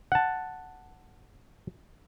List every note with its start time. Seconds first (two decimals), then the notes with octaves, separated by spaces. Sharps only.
0.12 F#5 A5